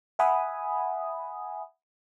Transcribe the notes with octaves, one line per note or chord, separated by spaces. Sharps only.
E5 F#5 G#5 B5 D#6